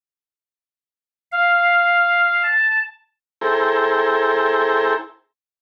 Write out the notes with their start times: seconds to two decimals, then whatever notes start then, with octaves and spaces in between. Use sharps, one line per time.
1.32 F5
2.43 A5
3.41 E4 G#4 A4 C5 G5 A#5